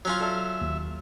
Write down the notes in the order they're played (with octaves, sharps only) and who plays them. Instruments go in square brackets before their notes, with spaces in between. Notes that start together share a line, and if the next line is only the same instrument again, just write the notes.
[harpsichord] F#3 C#4 F4
[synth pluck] A4 D5 A5 [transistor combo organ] E5
[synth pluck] D#2